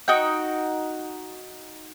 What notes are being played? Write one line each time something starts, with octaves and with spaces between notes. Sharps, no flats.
D#4 F#4 G5